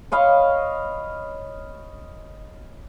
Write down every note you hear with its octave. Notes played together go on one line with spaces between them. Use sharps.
C#5 D#5 F5 B5